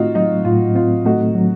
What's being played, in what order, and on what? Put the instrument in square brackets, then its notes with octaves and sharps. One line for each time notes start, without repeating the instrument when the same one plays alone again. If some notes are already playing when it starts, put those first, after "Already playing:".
Already playing: [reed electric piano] A2 A3 C4 [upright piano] D#4 F4 F#4
[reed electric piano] F#3 [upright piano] D#4
[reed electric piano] A2 [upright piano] F4
[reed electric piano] C4 [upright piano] F4
[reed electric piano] A3 [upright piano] D#4 F#4
[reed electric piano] F#3